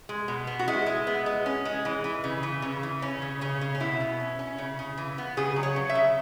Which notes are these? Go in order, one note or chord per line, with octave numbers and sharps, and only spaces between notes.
G#3
B2
B3
F#4
G#3 E4
G#3
B3
G#3
C#4
G#3
E3
E3
C#3
E3
C#3
E3
C#3 C#4
C#3
C#3 C#4
C#3
C#4
B2 E4
B2
C#4
C#4
C#3
C#3
E3
B3
C#3 G#4
F#3
C#5
C#3
E5
C#3